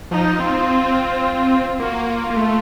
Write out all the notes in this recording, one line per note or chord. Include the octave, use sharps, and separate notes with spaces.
F3 D#4
C4 F4
A#3 F#4
F4
A#3
A3